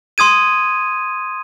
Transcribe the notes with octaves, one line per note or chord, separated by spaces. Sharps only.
C6 D#6 G#6 D#7